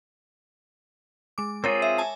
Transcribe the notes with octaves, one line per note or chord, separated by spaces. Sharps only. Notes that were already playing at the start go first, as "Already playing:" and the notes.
G#3 D6
C4 F4 G#4 A#4 C#5
E5
G#5 A5